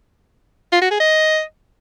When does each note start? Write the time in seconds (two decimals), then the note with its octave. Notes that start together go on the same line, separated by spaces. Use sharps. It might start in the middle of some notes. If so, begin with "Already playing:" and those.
0.72 F4
0.81 F#4
0.91 G#4
1.00 D#5